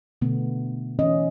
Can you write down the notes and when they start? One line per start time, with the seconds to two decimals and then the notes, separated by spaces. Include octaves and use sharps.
0.22 B2 D3 A3 B3
0.99 E3 C#4 D#5